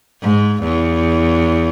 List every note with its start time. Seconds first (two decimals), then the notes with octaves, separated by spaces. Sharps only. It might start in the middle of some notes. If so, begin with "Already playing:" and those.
0.22 G#2
0.63 E2